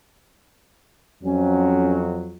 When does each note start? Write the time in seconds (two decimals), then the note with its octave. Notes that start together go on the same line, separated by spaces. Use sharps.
1.23 F2 F#3 C#4